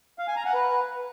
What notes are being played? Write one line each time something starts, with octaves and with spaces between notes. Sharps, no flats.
F5
G#5
A#5
F#5
B4